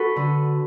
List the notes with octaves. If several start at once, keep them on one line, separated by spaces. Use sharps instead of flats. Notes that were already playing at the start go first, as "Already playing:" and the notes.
Already playing: F#4 A4 B4
D3